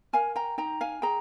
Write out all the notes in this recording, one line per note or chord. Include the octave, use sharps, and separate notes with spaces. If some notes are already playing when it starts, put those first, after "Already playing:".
A#4 F5 G#5
G5 A#5
D#4 G5 A#5
F5 G#5
G#4 G5 A#5